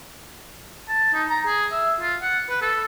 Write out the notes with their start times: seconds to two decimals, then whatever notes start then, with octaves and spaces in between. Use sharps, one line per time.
0.89 A5
1.14 D#4
1.30 A#5
1.47 G#4
1.72 E5
2.00 F4
2.21 F#5
2.49 B4
2.62 A4